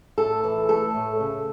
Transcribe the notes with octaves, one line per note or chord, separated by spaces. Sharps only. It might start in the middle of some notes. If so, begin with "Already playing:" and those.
A2 A4
E3
A3 A4
A2
C#3